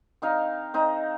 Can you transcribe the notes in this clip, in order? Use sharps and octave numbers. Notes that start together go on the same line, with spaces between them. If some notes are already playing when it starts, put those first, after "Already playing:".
C4 D#4 F5
C4 D#4